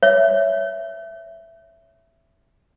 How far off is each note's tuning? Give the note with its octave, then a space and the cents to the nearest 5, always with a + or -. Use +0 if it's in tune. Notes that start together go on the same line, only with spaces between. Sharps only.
C#5 +10 E5 +10